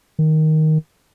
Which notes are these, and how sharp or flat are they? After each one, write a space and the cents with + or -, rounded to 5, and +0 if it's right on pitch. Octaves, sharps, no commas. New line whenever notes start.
D#3 +5